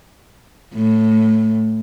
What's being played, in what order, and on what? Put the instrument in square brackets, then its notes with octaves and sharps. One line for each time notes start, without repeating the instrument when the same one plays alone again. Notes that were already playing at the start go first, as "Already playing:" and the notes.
[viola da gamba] A2